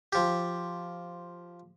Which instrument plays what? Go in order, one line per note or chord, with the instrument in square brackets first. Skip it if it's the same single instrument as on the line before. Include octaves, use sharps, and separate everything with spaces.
[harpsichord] F3 G4